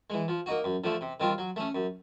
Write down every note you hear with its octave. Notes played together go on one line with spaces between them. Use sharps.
E3 G#3
F3
A#3 D#4 F#4
F#2
D3 F3 A3
C3
D#3 G3 C4 F4
F#3
A3 C#4
F#2